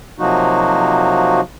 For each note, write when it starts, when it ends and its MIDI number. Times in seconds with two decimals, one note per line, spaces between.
0.19 1.41 48
0.19 1.41 53
0.19 1.41 54
0.19 1.41 58
0.19 1.41 63
0.19 1.41 66